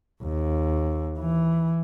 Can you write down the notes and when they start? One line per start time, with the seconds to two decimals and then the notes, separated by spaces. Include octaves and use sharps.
0.24 D#2
1.19 E3